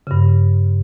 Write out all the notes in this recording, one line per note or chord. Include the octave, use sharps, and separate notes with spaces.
G2 C#3